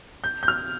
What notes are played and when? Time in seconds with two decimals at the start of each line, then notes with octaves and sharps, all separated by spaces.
0.24 G6
0.43 G6
0.48 F6